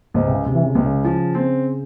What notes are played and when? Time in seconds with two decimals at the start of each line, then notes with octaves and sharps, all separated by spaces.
0.14 C#2 G#2
0.27 C3
0.34 C#3
0.45 C3
0.55 E3
0.65 C#3
0.75 C#2 C3
0.85 C#3
1.04 F3
1.35 C4